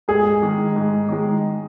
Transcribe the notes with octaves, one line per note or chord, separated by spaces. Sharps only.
G#2 G#4
D#3 G#3
G#2
D#3 G#3